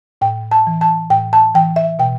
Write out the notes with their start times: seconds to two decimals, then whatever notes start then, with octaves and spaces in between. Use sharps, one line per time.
0.21 A2 G5
0.52 A5
0.67 E3
0.81 A5
1.10 A2 G5
1.33 A5
1.54 E3 G5
1.76 E5
1.99 B2 G5